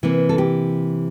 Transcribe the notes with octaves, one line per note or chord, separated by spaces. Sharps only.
C3 E3 A#3
A4
G4